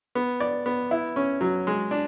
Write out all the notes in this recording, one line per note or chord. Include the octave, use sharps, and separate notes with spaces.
B3
D5
B3
E4
C#4
F#3
G#3
D4